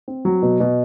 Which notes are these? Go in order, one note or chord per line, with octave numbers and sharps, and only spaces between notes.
C4
F#3
B2
B2